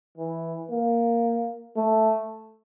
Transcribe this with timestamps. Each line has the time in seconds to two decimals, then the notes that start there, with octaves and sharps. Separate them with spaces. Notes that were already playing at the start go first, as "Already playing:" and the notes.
0.18 E3
0.71 A#3
1.77 A3